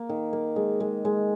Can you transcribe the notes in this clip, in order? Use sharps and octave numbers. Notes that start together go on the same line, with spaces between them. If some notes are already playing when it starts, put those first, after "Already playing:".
Already playing: A#3
D#3
A#3
G#3
G#3
G#3